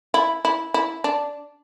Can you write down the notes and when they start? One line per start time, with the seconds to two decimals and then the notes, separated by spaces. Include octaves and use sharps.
0.14 E4
0.45 E4
0.74 E4
1.04 D4